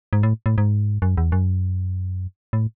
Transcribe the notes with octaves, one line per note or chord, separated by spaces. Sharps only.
G#2
A2
A2
G#2
F#2
E2
F#2
A2